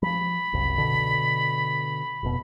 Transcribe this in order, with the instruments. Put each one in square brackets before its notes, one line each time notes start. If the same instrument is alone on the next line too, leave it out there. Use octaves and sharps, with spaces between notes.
[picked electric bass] F3 F#3 [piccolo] B5
[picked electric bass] F#1 C2
B2 D3
F1 B2